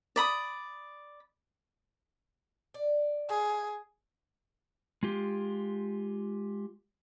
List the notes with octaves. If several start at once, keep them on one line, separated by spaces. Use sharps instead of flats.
D5 B5 D#6
D5
G#4 F5
G#3 F4 G4